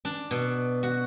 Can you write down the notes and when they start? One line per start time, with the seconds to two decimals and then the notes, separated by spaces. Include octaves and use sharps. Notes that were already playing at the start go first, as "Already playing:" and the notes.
0.05 D4
0.31 B2
0.83 F#4